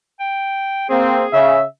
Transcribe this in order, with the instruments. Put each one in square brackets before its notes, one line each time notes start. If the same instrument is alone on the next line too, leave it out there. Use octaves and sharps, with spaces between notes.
[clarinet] G5
[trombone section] A#3 C4 [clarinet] G#4
[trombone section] C#3 [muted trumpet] E5